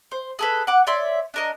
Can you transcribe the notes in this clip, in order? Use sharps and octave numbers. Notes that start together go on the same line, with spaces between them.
C5
G#4 A4 B4
F#5 D6
C#5 D5 E5 C6
D4 A#4 D#5